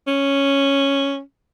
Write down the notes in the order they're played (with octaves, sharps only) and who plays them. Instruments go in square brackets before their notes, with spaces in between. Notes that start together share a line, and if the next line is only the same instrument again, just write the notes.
[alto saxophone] C#4